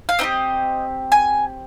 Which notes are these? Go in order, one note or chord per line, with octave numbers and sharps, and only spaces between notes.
F5
C4 D#4 G4 D#5
G#5